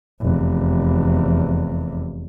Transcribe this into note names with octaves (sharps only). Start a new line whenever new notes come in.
F1 E2